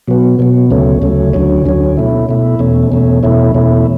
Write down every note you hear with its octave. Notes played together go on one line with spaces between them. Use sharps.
B2 F#3 B3
B2 F#3 B3
D2 C#3 F#3 A3 C#4
D2 C#3 F#3 A3 C#4
D2 D3 F#3 C#4
D2 D3 F#3 C#4
B2 A3 E4
B2 A3 E4
E2 B2 A3 C#4
E2 B2 A3 C#4
E2 B2 A3 C#4 E4
E2 B2 A3 C#4 E4